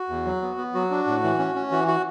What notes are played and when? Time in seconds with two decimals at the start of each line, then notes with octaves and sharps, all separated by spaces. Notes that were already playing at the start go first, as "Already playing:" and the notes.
Already playing: F#4
0.09 E2
0.25 F#3
0.42 B3
0.57 B3
0.74 F#3 F#4
0.90 D4
1.07 A2
1.23 E3
1.39 C#4
1.55 C#4
1.71 E3 F#4
1.88 F#4